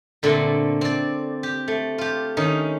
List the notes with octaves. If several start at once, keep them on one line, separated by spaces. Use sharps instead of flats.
A#2 D3 A3 C4
C4 D5
G4
A3
F4 G4
D#3 C#4 D#4